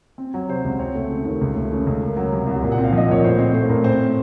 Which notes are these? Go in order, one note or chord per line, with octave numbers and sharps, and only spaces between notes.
C4
F#3
C3 C5
C#2
C4 C#5
A3
C#3
D#2
C#2
A3
C#3
C#2
A#3
F#3
C3
C2
A#2
F#5
C4
F5
F3 D#5
A#2 C#5
A2 C5
C4 C5
A3 C5
A2 A#4
C4 C5
A3